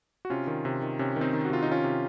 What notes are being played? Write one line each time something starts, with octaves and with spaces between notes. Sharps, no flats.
F#4
C3 C#4 F4
D#3
C3
D#3
C3 C#4
D#3
C4 D#4
D#3
F#4
C3 F4
D#4
D#3 C#4 F4
C3